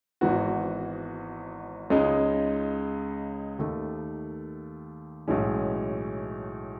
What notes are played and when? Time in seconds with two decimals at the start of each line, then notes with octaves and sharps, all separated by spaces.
0.21 G#1 G#2 E3 B3 F#4
1.90 C#2 C#3 G#3 D#4
3.59 D#2 D#3 A3
5.28 B1 A2 E3 G#3 C#4